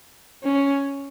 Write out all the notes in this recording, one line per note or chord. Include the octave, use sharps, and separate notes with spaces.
C#4